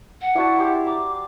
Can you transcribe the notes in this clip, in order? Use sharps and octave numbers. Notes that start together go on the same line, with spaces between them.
F#5
D4 E4 F#4 A5
G4 C5 A5
A#5 D6